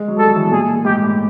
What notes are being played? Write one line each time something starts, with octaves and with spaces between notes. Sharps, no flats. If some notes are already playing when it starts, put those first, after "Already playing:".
Already playing: G#3
F#3
G3 A4
F#3
E3
B2
A#2 G#4
G#2 G4
A2